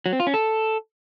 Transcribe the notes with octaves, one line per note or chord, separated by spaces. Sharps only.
F#3
C4
F4
C#4
A4